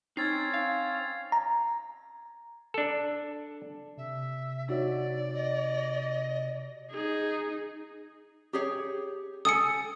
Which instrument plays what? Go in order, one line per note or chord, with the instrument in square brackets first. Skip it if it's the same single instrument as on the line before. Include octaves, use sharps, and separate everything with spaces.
[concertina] C4 C#4 [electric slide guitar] D#4 [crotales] G#6 A6 C7
[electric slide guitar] F5
[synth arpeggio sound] A#5
[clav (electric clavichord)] D4 A4
[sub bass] C3 [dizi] E5
[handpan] D#4 F#4 C#5 [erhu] D5
[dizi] D#5
[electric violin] D#4 G#4
[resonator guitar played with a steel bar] G4 G#4 C#5
[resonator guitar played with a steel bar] A4 G#5 [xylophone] D#6 C#7